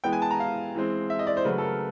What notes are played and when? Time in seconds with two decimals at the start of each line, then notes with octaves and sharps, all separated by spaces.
0.04 E3 G#3 B3 G5
0.13 G#5
0.22 A5
0.31 A#5
0.40 F5
0.75 E3 G#3 C4
1.10 E5
1.19 D#5
1.27 D5
1.37 C5
1.45 C#3 F#3 A3 B4
1.58 A4
1.62 A#4